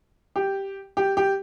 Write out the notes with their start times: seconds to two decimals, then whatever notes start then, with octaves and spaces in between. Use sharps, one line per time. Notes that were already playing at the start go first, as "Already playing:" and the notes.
0.36 G4
0.97 G4
1.17 G4